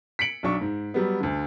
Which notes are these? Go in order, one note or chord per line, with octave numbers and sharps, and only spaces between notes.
B6 C#7 D7 F#7
B1 F#3 D4 C#6
G#2
F#3 G3 B3
D2 D3